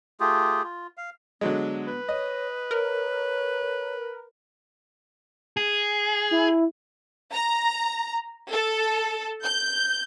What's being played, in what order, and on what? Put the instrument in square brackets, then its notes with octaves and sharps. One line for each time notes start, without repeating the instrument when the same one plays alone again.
[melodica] A3 F4 G4 G#4
F4
F5
[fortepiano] D3 F#3 G#3 [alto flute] B3
[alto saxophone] B4
[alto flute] C#5 [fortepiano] D#5
[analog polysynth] A#4 [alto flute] C#5
[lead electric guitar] G#4
[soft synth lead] E4
[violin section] A#5
A4
G6